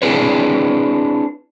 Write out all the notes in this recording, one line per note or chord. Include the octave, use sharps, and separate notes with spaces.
C4 D4 E4 G#4 B4 C#5